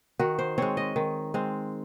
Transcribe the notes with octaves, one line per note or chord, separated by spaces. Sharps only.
D#3 F#4
C5
G#3 C4 C#5
D#5
D#3
G#3 C4